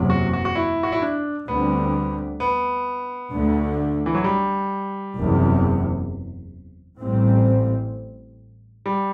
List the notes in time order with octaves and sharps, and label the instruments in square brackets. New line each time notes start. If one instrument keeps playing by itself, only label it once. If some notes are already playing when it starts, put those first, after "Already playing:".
Already playing: [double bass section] F#1 E2 C3 F#3
[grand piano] F#4
F#4
F#4
E4
F#4
E4
D4
[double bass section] D2 D3 G3 C4 [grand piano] B3
[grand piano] B3
[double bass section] D2 D3 A3
[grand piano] E3
F#3
G3
[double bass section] F#1 E2 C3
A1 A2 G3 C4
[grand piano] G3